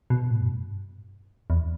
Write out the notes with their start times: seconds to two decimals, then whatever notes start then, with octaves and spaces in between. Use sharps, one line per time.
0.10 B2
0.31 A2
0.41 F#2
0.50 G2
1.50 E2